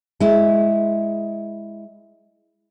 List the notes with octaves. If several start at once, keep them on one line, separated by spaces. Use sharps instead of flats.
G#3 E4